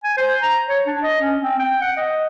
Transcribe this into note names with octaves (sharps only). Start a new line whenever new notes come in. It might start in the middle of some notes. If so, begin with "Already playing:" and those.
G#5
C5
A#5
C#5
D4
D#5
C#4
C4
G5
F#5
D#5